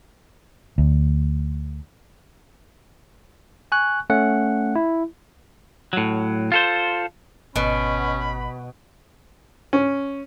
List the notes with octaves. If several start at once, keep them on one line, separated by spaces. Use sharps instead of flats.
D2
G#5 C#6 F#6
A3 C#4 F#5
E4
A2 F#3
F4 A4 C5
G#1 B2 C#4 B5
C#4